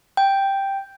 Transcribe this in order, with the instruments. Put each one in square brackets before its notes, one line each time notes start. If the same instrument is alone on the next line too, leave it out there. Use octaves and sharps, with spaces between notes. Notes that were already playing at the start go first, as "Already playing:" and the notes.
[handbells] G5